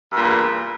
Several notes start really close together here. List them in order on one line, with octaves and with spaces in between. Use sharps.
G2 A#2 E2